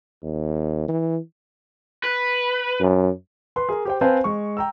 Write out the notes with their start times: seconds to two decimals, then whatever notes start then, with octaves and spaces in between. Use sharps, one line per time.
0.23 D#2
0.88 E3
2.04 B4
2.80 F#2
3.56 B4 C6
3.69 G#4 A#4
3.85 G4 C5 G5
4.01 C4 B4 C5 F5 G#5 A5
4.24 G#3 C#6
4.57 G5 A#5 E6